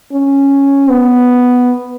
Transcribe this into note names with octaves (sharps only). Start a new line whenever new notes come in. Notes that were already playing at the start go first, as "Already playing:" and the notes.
C#4
B3